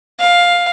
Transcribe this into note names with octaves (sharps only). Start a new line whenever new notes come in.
F5